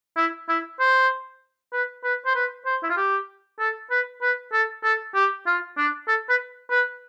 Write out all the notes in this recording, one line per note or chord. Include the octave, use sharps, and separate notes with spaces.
E4
E4
C5
B4
B4
C5
B4
C5
E4
F4
G4
A4
B4
B4
A4
A4
G4
F4
D4
A4
B4
B4